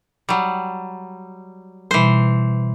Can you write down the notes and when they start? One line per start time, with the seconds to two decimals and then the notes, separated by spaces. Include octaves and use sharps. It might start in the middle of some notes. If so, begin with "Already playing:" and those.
0.29 F#3 G3
1.91 B2 E3 G3 C5